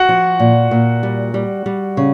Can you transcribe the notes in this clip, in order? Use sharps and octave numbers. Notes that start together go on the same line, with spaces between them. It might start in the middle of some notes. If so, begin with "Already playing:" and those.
Already playing: F#4 F#5
F3
A#2
A#2
G3
G3
G3
C#3